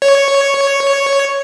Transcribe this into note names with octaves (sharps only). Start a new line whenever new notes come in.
C#5